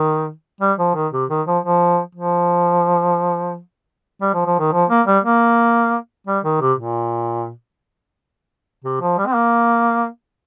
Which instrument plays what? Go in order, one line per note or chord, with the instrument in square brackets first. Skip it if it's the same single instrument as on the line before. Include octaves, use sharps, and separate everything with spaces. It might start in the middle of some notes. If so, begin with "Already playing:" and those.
Already playing: [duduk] D#3
G3
F3
D#3
C3
D#3
F3
F3
F3
G3
F3
F3
D#3
F3
A#3
G3
A#3
G3
D#3
C3
A#2
C3
F3
G3
C4
A#3